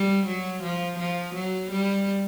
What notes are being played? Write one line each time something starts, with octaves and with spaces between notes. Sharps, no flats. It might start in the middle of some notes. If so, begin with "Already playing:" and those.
Already playing: G3
F#3
F3
F3
F#3
G3